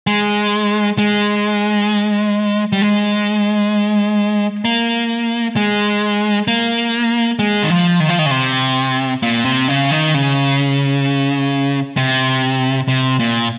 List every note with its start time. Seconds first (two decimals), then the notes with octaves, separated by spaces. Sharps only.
0.07 G#3
0.98 G#3
2.72 G3
2.81 G#3
4.65 A#3
5.56 G#3
6.48 A#3
7.39 G#3
7.64 D#3
7.70 F3
8.00 D#3
8.09 F3
8.19 D#3
8.26 C#3
8.31 C3
9.23 A#2
9.45 C3
9.68 C#3
9.91 D#3
10.14 C#3
11.97 C3
12.88 C3
13.19 A#2